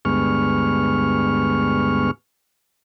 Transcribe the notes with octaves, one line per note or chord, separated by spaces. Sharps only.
D2 G2 G#3 B3 C#6 F6